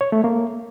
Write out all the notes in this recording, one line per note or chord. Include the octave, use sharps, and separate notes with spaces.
C#5
A3
A#3